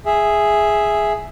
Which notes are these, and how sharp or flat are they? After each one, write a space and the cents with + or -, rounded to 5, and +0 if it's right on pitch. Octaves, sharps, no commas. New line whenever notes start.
G#4 +0 E5 +0